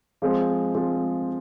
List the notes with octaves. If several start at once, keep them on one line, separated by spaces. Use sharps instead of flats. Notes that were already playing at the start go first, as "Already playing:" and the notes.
F3 G#3 C4 F4
F3 G#3 C4 F4